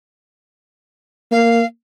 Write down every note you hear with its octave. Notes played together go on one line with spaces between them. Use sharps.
A#3 F5